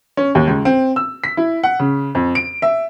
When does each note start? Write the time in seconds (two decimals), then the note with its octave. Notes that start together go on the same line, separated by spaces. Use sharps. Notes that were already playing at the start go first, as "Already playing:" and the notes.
0.17 C#4
0.35 D#2
0.47 C#2
0.65 C4
0.96 E6
1.24 B6
1.37 E4
1.63 F#5
1.79 C#3
2.15 F2
2.35 D7
2.62 E5